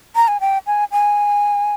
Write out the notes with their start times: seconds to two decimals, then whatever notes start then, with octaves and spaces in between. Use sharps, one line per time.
0.16 A#5
0.28 G#5
0.40 G5
0.67 G#5
0.92 G#5